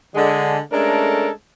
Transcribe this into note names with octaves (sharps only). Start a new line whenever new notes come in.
D3 G#3
G#3 A3 C#4 D4 A4 A#4